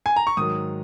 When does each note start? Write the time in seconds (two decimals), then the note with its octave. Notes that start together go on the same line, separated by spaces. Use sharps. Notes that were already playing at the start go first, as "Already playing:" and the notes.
0.06 G#5
0.16 A#5
0.27 C#6
0.37 G#2 D#3 F#3 D#6